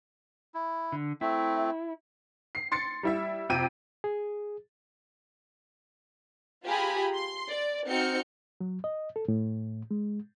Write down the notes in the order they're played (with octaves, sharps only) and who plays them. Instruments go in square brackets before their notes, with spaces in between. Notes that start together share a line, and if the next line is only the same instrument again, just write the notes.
[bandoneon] E4
[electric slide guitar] D3
[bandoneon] A3 C4 [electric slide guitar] E4
[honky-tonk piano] C7
C6 A6 C#7
G3 E4 E5
F2 C3 G5 D#7
[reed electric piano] G#4
[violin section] F4 G4 G#4 G#5 A#5 B5
C6
D5
C4 D#4 F#4 F6 G6 C#7
[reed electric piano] F#3
D#5
A4
A2
G#3